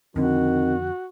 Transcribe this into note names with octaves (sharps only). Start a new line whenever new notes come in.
F2 D3 D#3 C4 F#4